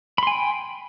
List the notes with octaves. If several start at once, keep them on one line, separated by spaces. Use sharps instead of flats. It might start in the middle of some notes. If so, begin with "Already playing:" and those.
G5 G#5 B5 C6